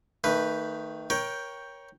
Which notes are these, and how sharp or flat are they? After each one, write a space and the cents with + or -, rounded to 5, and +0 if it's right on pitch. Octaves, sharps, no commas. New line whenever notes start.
D#3 +0 A3 +30 B4 +0
A#4 +25 C#5 +0 G5 +0